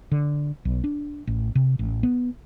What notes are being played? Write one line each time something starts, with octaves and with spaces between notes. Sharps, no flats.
D3
B1
D4
A1
C3
A1
B3